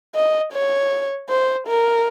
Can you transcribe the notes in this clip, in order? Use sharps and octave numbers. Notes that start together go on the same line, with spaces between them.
D#5
C#5
C5
A#4